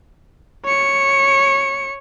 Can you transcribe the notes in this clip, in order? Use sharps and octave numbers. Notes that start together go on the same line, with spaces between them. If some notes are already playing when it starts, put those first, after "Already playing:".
C#5 C#7